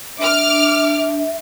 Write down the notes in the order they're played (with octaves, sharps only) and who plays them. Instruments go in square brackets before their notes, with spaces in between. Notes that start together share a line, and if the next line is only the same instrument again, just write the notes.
[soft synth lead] D4 [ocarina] E5 [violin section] D6 F6